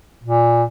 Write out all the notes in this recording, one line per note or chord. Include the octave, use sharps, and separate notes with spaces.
A#2